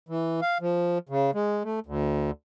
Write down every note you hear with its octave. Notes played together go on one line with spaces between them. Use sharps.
E3
F5
F3
C#3
G#3
A3
D2